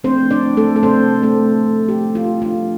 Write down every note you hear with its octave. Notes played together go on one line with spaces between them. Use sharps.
F3 A3 C4 D4 C5
D4 D5
A3 A4
A4
C3 A3 C4 C5
A3 A4
F3 C4
G4
F4
F3 D4 F4